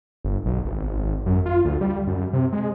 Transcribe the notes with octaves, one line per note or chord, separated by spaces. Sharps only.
G1
B1
G#1
F#2
F4
D2
G3
F#2
C3
G#3